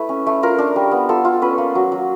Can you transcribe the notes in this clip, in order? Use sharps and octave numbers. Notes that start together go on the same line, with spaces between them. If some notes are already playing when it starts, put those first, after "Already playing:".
Already playing: A3 E4 B4
C#4
A3
F4 A#4
D4
G3
B3
F4 A4
F4
C#4 B4
A#3
F#3
F#3